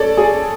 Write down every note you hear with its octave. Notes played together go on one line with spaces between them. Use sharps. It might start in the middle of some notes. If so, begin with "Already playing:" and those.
Already playing: A4 C#5 D5
G#4